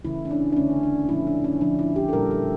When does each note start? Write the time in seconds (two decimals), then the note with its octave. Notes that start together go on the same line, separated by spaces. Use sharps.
0.05 C#3 E3 A3 E4
0.25 C#4
0.31 D4
0.52 D4
0.57 D3 A3 C#4
0.83 D4
1.09 A#2 F3 A3 C#4 E4
1.27 D4
1.44 C#4
1.61 D3 F3 C#4 D4
1.79 E4
1.96 G4
2.09 A4
2.13 A#2 G3 A#3 C#4 A#4
2.31 A4